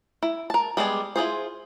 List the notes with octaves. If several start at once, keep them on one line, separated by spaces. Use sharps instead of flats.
E4
A#4 A5
G3 G#3 B3 D5 G#5
E4 F4 G#4 C5